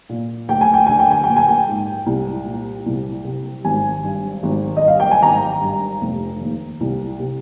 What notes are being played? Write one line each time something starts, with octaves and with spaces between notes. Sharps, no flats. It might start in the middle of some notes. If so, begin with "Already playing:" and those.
A#2
D2 G5
G#5
G5
D3 G#5
G5
G#5
A#1 G5
G#5
G5
G#2
C2
A#2
C2
C3
G#1 G#5
G2
G#1
D#5
G2 F5
G5
G#5
G#1 A#5
G2
F1
D#2
C2
C3